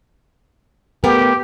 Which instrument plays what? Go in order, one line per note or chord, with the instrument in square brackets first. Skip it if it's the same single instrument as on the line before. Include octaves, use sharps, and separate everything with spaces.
[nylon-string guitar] A3 B3 A#4 [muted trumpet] G4